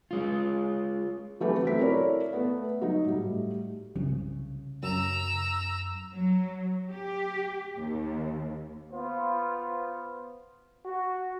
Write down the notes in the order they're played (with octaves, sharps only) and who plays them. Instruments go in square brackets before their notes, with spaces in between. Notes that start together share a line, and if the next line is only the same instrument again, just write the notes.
[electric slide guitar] G#3 F4
[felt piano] E3 F#3 A3 C4 G4 B4
F#3 C4 B6
E4 A4 A#4 C#5 D5
A3 B3
F#3 D#4
A2 G3
[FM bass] C2 [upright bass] C#3
[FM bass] F#2 [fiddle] A#5 E6
[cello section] F#3
G4
D#2
[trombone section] B3 F4 C5
F#4